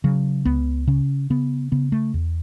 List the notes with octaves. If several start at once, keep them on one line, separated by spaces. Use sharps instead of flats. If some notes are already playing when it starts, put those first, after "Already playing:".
C#3 F#3
C#2 B3
C#3 C#4
C#3 B3
C#3 B3
A3
E2